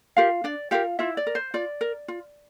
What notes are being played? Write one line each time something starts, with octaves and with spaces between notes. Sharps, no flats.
F4 G4 A#4 F5
D4 D5
F4 G4 A#4 F5
E4 F4 E5
D5
A#4
C5
F4 D5
A#4
F4